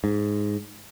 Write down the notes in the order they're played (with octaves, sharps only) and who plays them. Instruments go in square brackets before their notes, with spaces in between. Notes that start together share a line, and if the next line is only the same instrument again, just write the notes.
[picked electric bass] G#2